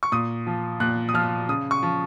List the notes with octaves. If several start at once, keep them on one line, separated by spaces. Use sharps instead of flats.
C#6
A#2 D#6
F3
A#2 F#6
D#6
F3 F6
C#3 D#6
C#6
F3